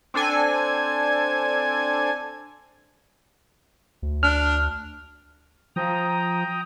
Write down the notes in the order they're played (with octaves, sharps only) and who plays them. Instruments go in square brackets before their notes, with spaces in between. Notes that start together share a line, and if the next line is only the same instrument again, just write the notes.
[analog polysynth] C4 D4 A4 G#5
[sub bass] D2
[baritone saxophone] D4 [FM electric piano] F6
[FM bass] F3 [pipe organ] G5 A#5 D#6